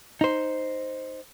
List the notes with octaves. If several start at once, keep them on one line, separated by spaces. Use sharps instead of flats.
D#4 C5